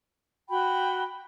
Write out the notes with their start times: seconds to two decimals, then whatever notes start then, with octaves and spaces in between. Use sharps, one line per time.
0.49 F#4 G5 B5